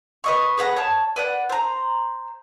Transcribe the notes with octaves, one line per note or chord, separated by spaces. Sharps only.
B4 D#5 C#6
G#4 B4 F#5 A#5
C#5 A5
B4 D5 F#5
C5 A#5